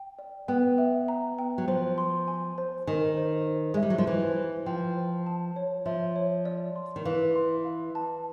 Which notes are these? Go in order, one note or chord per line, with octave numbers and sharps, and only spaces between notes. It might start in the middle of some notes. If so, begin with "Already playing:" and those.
Already playing: G5
D5
B3 G5
E5
A#5
G5
F#3
F3 C5
C6
G#5
C5
D#3 G#5
C5
C5
G#3 E5
G3
F#3
F3
E3 C5
C5
F3 G5
C5
A5
C#5
F3 E5
C#5
D5
C6
D#3
E3 F5
C6
F5
A5